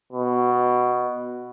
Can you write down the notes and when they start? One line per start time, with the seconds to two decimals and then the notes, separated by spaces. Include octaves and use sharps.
0.12 B2